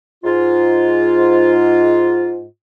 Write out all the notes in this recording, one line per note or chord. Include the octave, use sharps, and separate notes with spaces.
G#2 F4